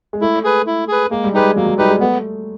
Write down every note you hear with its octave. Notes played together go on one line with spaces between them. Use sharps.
G#3
A3 E4
G#4 B4
E4
G#4 B4
G#3 A#3
G3
G#3 D#4 G4 B4
F#3 A#3
F#3
G3 D#4 G4 B4
G#3
A3 B3